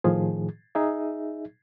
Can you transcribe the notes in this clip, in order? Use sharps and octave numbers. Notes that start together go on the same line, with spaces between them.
A2 D#3 F3 G#4
D#4 G#4 E5